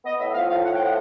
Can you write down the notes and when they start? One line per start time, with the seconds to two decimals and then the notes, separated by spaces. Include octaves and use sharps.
0.05 B3 D#5
0.19 A2 E5
0.34 F3 F5
0.49 A2 F5
0.64 A2 F#5
0.75 G5
0.80 F3 F#5